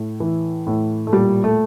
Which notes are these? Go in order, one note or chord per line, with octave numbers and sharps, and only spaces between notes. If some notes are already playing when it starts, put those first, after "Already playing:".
Already playing: A2
E3
A2
A3
A#2 G3
A3